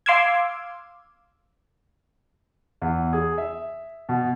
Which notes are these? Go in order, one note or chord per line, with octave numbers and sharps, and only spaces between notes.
F5 C6 D6 E6 F6 G#6
E2
G#4
E5
B2